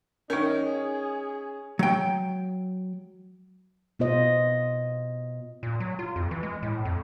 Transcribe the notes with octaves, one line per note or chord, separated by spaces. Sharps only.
D#3 C#4 D#4 A#4
G#4
F#3 G5
B2 B3 F4 C5 D#5
A#2
F#3
F4
F2
E3
G#3
A2
F2